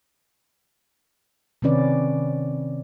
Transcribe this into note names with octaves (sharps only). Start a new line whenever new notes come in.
C3 D#3 C4 C#4 B4 D5